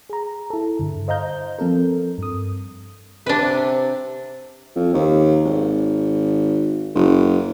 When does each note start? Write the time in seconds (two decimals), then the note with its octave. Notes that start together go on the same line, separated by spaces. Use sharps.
0.10 G#4 A#5
0.50 E4 A4
0.79 G2 D3
1.08 C5 D#5 F5 A#5 G6
1.59 F3 C4 A4 A#4
2.18 G2 D#6
3.26 C3 D4 B4
4.76 F2
4.94 D#2
5.45 G#1
6.95 F#1